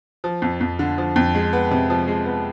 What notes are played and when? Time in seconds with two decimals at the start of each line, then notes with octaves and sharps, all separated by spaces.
0.24 F3
0.42 F2
0.61 F2
0.79 D3
0.98 F3
1.16 F2
1.35 G#3
1.53 B3
1.71 C3
1.90 F3
2.08 G#3
2.25 B3